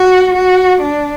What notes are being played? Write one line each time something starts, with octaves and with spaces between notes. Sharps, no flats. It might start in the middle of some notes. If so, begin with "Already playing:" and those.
Already playing: F#4
F#4
D4